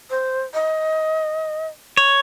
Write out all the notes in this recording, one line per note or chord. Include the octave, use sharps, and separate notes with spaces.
C5
D#5
C#5